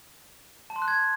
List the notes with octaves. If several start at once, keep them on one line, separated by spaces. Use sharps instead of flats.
A5
C6
F#6
G#6